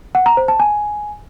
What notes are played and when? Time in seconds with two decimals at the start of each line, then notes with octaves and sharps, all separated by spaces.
0.15 F#5
0.26 A#5
0.37 C5
0.48 A5
0.60 G#5